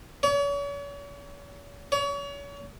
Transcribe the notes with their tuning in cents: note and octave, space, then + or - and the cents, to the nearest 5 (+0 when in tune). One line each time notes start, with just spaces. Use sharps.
C#5 +40
C#5 +35